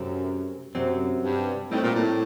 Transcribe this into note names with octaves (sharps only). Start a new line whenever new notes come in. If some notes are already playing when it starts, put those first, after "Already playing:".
Already playing: F#2 C3 F#3 A3 C4
F#2 C3 F#3 C4
G2
A2 G3 C4 D#4 G4
A#2
A2